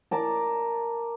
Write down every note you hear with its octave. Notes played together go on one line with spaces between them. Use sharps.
A#4 D5 A5